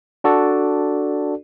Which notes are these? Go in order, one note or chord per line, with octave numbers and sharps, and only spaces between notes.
D4 F#4 A4 D5